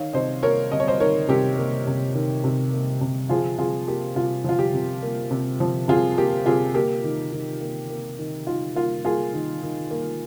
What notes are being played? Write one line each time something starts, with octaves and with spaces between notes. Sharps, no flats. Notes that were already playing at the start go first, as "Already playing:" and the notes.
Already playing: D#3 C#5 F5
C3 C5 D#5
A#3 A#4 C#5
C3 D#5
C#5
C5 D#5
D#3 A#4 C#5
C3 G4 A#4
A#3
C3
D#3
C3
A#3
C3
F3 F4 G#4
C3 F4 G#4
A#3 G4
C3 F4
F3 F4
G4
C3
A#3
C3
F3
C3 F4 G#4
A#3 G4
C3 F4 G#4
A#3 G4
D#3
D#3
A#3
A#3
D#3
D#3 F4
A#3 F4
A#3 F4 G#4
D#3
D#3
A#3